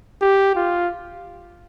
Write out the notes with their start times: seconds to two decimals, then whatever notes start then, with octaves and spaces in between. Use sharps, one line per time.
0.22 G4
0.56 F4